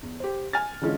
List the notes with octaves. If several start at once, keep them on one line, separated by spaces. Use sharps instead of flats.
E2
G4 C5
G#5 F6 A6
D3 E3 G#3 C#4 F4